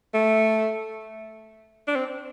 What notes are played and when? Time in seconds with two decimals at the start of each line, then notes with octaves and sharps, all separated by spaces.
0.14 A3
1.87 D4
1.95 C4